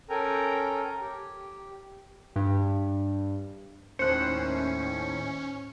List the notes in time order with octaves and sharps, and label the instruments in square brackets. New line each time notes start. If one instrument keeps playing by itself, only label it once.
[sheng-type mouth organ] C#4 A4 A#4 G5 G#5 A#5
G4
[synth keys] G2
[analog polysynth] D#2 A2 D#3 [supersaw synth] C#4 [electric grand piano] C5 F#6 [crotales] C#7